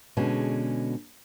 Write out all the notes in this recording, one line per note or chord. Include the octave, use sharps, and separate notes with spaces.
B2 D3 G#3 C#4